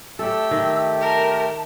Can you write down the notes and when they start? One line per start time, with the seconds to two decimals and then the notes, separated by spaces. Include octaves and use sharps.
0.19 A3 G4 A4 D5 E6
0.51 D#3
1.01 A#4 A5